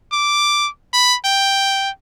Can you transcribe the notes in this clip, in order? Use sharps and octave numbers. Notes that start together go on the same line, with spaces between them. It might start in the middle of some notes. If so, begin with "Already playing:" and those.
D6
B5
G5